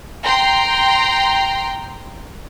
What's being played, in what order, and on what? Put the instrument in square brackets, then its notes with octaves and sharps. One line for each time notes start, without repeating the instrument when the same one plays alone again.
[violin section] G5 A#5 C6